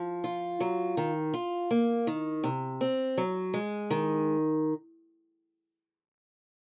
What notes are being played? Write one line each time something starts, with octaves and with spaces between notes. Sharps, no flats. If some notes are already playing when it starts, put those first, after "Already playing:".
Already playing: F3
F4
F#3
D#3
F4
A#3
D#3
C3
C4
F#3
G#3
D#3